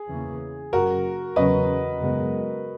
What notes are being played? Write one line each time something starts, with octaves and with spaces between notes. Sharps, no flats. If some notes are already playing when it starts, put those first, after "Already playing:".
Already playing: G#4
E2 C#3 E3 A#3 C#4
F#1 F#2 C#3 F#4 A#4
E2 C#3 F#3 C#4 B4 D#5
F#2 C#3 G#3 B3